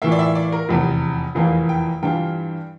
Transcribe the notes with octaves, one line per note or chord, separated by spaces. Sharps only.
A2 E3 A#3 F4 E5
D5
E5
D5
A#4
F1 E2 C3
F1 E2 E3 A#3 F4
G5
G2 E3 G3 D4 F4 G5